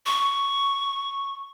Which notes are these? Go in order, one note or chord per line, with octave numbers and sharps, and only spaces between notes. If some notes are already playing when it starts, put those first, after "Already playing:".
C#6